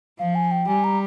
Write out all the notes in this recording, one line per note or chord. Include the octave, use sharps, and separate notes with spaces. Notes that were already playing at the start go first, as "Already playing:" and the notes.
F3 F5
G#5
G5
G3 G#5
A#5